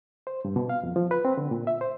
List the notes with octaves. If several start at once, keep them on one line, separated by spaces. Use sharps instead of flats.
C5
G2
B2
F5
F2
F3
B4
C4
D3
A#2
E5
C5